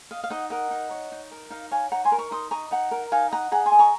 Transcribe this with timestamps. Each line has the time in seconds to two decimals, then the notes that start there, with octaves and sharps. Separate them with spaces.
0.11 D#5 F5
0.24 F5
0.30 D#4 D#5 F#5
0.50 A#4 D#5 F#5
0.71 D#4
0.91 C#5
1.12 D#4
1.31 A#4
1.50 D#4 F5
1.71 C#5 F5 G#5
1.92 D#4 F#5 A#5
2.05 G#5 C6
2.12 A#4
2.18 A#5 C#6
2.31 D#4 C6 D#6
2.51 D#5 A#5 C#6
2.71 D#4 F#5 A#5
2.91 A#4
3.12 D#4 F5 G#5
3.31 D#5 F#5 A#5
3.52 G#4 F#5 A#5
3.66 G#5 C6
3.72 D#5
3.79 A#5 C#6